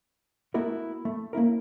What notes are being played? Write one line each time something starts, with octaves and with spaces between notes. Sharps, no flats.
A3 B3 E4 F#4 A#4
A3
A#3 C#4 E4 A#4